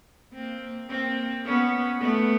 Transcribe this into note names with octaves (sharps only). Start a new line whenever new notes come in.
A#3 C4
A#3 C4
B3 C#4
A3 B3